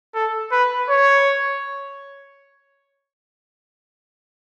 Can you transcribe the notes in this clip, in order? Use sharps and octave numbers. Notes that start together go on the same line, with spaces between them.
A4
B4
C#5